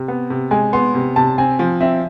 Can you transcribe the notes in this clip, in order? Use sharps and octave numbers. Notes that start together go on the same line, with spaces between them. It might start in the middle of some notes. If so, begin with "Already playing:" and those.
Already playing: C3
B3
C3
G#3 G#5
B3 C6
C3
C3 A5
C4 G#5
F3
C4 E5